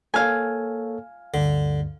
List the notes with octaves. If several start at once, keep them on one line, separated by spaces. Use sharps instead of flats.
A#3 A4 C#5 F5 G#5
D2 G2 D3